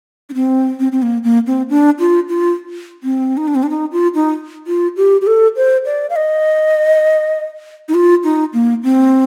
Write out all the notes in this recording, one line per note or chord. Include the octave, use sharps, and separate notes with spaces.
D4
C4
C4
C4
A#3
A#3
C4
D4
F4
F4
C4
D#4
D4
C4
D4
D#4
F4
D#4
F4
G4
G4
A4
C5
D5
F5
D#5
D#4
F4
D#4
A#3
C4